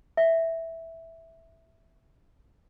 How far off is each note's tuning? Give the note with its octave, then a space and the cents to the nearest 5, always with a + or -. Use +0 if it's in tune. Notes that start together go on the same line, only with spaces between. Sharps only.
E5 -5